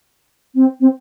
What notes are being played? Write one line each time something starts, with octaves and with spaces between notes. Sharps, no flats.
C4
C4